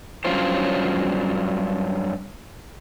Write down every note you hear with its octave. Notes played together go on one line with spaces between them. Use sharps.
G2 F#3 C#4 F4 C5